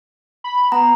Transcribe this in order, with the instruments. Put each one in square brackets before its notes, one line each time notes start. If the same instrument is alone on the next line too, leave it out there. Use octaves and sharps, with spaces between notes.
[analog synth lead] B5
[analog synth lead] B3 [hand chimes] A#5